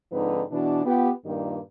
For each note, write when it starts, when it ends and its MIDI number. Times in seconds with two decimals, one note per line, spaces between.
0.12 0.43 44
0.12 0.43 50
0.12 0.43 53
0.12 0.43 60
0.12 0.43 63
0.12 0.43 71
0.52 0.83 47
0.52 0.83 52
0.52 0.83 62
0.85 1.10 59
0.85 1.10 65
0.85 1.10 67
1.26 1.59 43
1.26 1.59 46
1.26 1.59 51
1.26 1.59 58
1.26 1.59 67